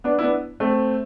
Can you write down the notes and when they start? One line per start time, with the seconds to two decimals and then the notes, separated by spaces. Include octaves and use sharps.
0.04 B3 D4
0.19 E4
0.23 B3 D4
0.60 A3 C4